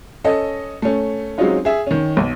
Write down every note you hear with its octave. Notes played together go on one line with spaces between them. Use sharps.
C#4 A4 D#5
A3 C#4
F#3 G#3 C4 C#4 D#4 F4
G#4 E5
D#3 C#4
B1